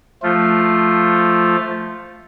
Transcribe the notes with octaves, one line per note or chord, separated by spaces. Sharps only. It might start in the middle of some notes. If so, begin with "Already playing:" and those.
F3 A3 F4